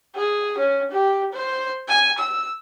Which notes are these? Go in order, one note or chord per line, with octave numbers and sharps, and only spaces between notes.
G#4
C#4
G4
C5
G#5
E6